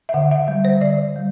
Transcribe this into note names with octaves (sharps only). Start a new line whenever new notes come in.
E5
D3 F#5
E5
G3 E5
C5
D3 D5
G3